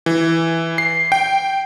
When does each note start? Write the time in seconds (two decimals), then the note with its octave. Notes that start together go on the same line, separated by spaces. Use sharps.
0.06 E3
0.78 C7
1.12 G5